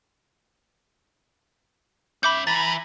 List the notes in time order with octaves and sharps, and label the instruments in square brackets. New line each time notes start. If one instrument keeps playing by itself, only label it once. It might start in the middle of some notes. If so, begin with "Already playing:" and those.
[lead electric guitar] C#4 E5 [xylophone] B5 D6 G6
[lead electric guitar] E3 [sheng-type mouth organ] A#5 B5 [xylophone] A6